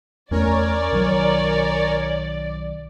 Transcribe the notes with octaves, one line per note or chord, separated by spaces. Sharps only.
E2 A3 C#4 A#4 C#5 D5 G#5
B1 D#3 F#3